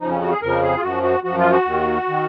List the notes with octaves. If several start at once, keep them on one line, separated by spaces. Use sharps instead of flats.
F2 C#3 F3 D#4
C#4
F#4
G#4
F2 C#3 F3 A#4
G#4
F4
F#2 F3 F#4
F#4
F#2 F3 F#4
F4
F#4
D#2 D#3
D#3